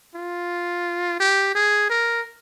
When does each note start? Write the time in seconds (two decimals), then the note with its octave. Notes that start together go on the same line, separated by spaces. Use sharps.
0.15 F4
1.20 G4
1.55 G#4
1.90 A#4